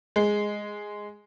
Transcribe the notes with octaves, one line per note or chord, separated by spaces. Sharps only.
G#3